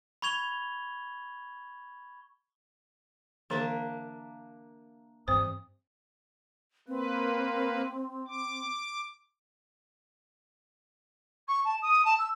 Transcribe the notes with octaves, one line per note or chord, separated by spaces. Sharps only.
B5 C#6 G#6 F7 G7
D3 E3 A#3 D4 G#4 E5
G2 E3 C4 C5 D#6
A#3 C4 B4
D6
C#6
A5
D#6
A5
E6